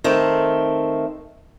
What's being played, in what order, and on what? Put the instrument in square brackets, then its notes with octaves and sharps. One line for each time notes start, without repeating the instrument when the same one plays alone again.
[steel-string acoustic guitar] D#3 A3 C4